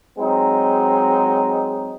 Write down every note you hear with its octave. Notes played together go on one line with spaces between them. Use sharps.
F#3 G#3 C4 D#4